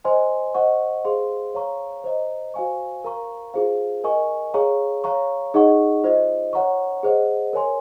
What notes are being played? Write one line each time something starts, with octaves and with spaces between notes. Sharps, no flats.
C5 D#5 G#5 C6
C5 D#5 F#5 C#6
G#4 C5 F5 C6
C#5 F5 A#5 C#6
C5 D#5 A#5
F#4 C5 F5 G#5 C#6
A#4 F5 A#5 C#6
F4 G#4 C5 F5
A#4 D#5 G#5 C#6
G#4 C#5 F5 A#5 C#6
C#5 F5 A#5 C#6
D#4 G#4 D#5 F#5 C#6
F4 C5 D#5
C#5 F#5 A#5 C#6
G#4 C5 D#5 F#5
A#4 C#5 G#5 C6